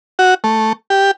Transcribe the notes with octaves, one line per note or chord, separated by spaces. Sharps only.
F#4
A3
G4